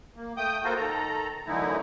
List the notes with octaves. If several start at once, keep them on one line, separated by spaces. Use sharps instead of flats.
A#3
A3 G5 D#6 G6
A#3 F4 F#4 A4 A#4 C5
D#3 A4 A#5
F#2 D3 E3 A3 D#4 E4